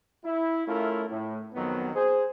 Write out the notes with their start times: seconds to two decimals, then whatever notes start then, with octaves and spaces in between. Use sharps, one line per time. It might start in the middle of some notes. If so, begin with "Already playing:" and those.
0.24 E4
0.66 A3 C#4 E4 F4 A#4
1.09 A2
1.54 F2 D#3 F#3 B3
1.94 G#4 C5